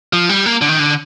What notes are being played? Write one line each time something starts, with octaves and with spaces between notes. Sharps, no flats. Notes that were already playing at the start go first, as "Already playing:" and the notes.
F3
G3
A#3
D3
D#3
D3